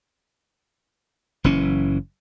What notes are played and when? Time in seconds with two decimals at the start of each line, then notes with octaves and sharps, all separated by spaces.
1.44 F#1 E3 C#4